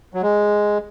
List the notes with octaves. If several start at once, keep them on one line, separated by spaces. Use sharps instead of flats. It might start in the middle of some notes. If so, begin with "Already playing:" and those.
F#3
G#3